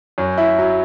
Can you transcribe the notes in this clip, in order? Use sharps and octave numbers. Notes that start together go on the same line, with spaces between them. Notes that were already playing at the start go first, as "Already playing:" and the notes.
F#2
E4
F#3